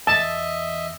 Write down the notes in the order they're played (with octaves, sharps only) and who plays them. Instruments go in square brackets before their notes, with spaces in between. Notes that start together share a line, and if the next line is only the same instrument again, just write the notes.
[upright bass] E2 [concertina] D#5 E5 [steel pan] A5